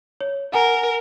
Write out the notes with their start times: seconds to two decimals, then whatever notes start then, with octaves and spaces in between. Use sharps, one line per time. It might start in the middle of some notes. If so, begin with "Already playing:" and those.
0.21 C#5
0.53 A#4 F#5 G#5 A#5